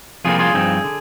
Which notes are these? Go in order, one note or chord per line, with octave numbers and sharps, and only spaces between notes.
F2 C3 G3 A#3 F4 G#4
F4 G#4
G2 F3 C4 D#4
D3